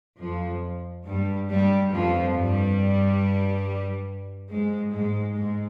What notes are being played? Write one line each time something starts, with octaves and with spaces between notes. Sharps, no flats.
F2 F3
G2 G3
G2 G3
F2 F3
G2 G3
G#2 G#3
G#2 G#3
G#2 G#3